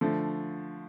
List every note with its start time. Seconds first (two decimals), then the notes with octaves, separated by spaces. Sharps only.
0.01 D3 F3 A3